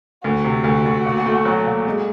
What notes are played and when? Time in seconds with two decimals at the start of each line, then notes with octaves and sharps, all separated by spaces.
0.24 D2 F#4
0.44 C3
0.64 D2
0.85 D2
1.05 A#2
1.26 A3
1.45 F#3
1.66 A#2
1.87 G#3